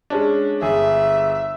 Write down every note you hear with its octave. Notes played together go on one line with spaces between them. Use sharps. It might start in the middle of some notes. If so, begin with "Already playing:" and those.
G#3 C#4 D4
G1 G#4 E5